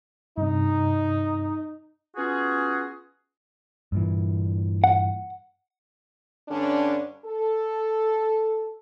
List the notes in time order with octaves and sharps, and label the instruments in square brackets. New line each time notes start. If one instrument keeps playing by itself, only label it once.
[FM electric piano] G2 C3 [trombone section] D#4
[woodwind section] B3 C#4 F4 F#4 G#4
[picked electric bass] G2 A#2 E3
[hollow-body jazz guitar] F#5
[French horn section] G2 D3 C#4 D4
A4